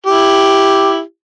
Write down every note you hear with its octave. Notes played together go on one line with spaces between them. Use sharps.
E4 G4